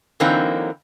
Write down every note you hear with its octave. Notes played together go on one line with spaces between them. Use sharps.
D3 E3 F#3 A#3 C4 D#4